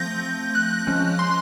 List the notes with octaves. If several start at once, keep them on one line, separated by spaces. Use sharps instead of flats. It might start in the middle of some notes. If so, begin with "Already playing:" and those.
Already playing: F3 A3 C4 G6 A#6
F#6
F3 G#3 C#4
C6